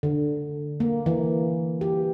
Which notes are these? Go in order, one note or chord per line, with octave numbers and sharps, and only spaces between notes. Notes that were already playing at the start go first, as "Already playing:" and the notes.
D3
A#3
E3
G4